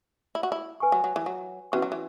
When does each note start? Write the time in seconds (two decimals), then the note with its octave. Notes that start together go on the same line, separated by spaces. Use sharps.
0.35 E4
0.43 F#4
0.52 E4
0.80 B4 G#5 C#6
0.92 F#3
1.04 F#3
1.16 E3
1.26 F#3
1.72 E3 C#4 F#4 B4 F#5 C#6
1.82 F#3
1.92 E3